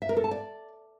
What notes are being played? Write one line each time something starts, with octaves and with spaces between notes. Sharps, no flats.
E5
A#4
A4
A5
D5